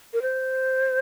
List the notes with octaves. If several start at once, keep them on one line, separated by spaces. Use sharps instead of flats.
A#4
C5